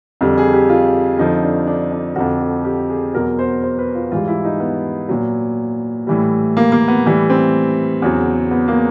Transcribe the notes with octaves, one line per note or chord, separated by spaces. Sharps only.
F2 D3 G3
G#4
G4
F4
F2 D3 F3 D#4
D4
D4
D4
F2 D3 F3 F#4
F#4
G4
G#4
E2 B2 F#3 A#4
C5
C5
B4
F4
G#2 E3 G3 F4
E4
D#4
B3
A#2 F#3
A2 E3 G3
A#3
A#3
B3
A2 E3 G3
C4
E2 C#3 F#3
B3
A#3